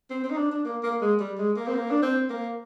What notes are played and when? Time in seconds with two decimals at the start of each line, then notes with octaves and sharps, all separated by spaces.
0.11 C4
0.24 C4
0.31 D#4
0.38 D4
0.51 D4
0.65 A#3
0.83 A#3
1.01 G#3
1.20 G3
1.38 G#3
1.56 A#3
1.67 C4
1.75 A#3
1.91 D4
2.02 C4
2.30 A#3